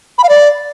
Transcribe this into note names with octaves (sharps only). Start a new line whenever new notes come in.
B5
F5
D5